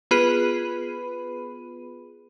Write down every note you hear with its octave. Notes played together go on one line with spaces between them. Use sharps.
B3 F4 G#4 B4 B5 D#7